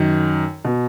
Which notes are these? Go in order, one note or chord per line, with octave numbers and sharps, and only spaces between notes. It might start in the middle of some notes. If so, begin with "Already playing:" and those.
Already playing: F#2 D#3
B2